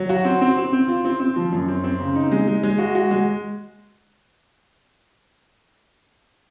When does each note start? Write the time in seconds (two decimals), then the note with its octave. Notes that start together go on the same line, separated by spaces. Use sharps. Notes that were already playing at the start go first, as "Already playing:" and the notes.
Already playing: F#3
0.09 F#4
0.25 C4
0.41 C4
0.57 C4
0.73 C4
0.88 F4
1.05 C4
1.20 C4
1.36 F3
1.52 F#2
1.68 C4
1.84 C4
2.00 C#3
2.15 D#4
2.32 G#3
2.48 G#3
2.63 G#3
2.78 F#4
2.95 F#4
3.11 G#3